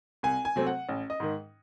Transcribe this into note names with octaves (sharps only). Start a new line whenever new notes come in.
C2 G#5
G#5
C3 F#3 A3 C4
F#5
A1
D#5
G#2 D#3